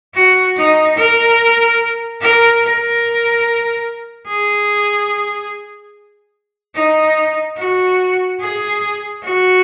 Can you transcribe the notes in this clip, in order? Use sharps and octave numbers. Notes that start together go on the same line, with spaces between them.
F#4
D#4
A#4
A#4
A#4
G#4
D#4
F#4
G#4
F#4